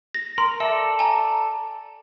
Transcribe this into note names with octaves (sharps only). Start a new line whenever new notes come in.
A#6
A#4 C6
A4 D5 E5
G#5 A#5